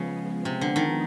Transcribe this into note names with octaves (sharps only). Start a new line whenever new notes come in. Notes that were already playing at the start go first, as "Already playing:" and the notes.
Already playing: C#3 F3 G#3 B3
C3
D3
D#3